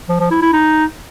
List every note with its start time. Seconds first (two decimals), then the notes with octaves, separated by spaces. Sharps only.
0.09 F3
0.20 F3
0.31 E4
0.42 E4
0.53 D#4